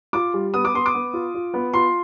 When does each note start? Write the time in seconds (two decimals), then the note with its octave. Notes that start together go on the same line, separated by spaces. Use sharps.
0.13 F4 D6
0.34 G3
0.54 B3 D#6
0.65 D6
0.74 B3 C6
0.86 D6
0.94 B3
1.14 F4
1.34 F4
1.54 B3
1.74 F4 C6